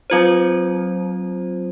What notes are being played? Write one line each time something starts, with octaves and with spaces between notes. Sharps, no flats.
F#3 C4 F4 C5